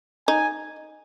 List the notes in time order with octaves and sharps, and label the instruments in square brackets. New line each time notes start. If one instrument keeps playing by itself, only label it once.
[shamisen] D#4 [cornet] G#5